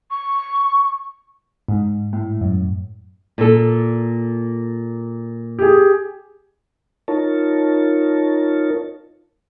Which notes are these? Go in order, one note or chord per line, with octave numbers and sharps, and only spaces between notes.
C#6
G#2
A2
F#2
A#2 A4
G4 G#4
D#4 F4 A#4 C#5 A5